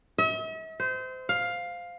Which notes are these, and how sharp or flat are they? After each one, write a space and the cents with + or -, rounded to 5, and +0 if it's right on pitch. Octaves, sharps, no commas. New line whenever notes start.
E5 -45
C5 -25
F5 +10